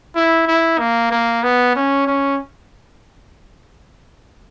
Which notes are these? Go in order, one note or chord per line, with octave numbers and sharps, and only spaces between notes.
E4
E4
A#3
A#3
B3
C#4
C#4